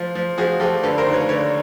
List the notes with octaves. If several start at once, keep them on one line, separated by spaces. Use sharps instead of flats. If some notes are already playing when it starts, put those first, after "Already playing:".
Already playing: F3
F3
F3 F#4 G#4
F3 G4 A4
D3 A4 B4
A#4 C5
D#2
B4 C#5
D3 B4 C#5